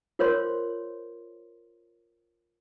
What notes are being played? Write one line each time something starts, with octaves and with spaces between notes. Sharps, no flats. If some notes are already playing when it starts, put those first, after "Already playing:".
F4 A#4 C5 C#5 C6